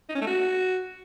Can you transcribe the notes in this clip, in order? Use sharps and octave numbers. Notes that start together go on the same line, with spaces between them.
D#4
C#4
A3
F#4